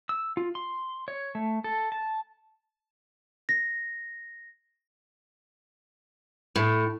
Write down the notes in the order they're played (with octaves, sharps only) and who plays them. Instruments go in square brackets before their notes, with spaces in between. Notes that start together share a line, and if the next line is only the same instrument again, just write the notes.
[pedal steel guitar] E6
F4
C6
C#5
A3
A4
A5
[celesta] A#6
[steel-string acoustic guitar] A2